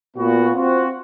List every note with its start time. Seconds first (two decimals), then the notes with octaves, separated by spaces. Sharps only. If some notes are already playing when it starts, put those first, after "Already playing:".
0.17 A#2 B3 F#4
0.55 C4 F4 F#4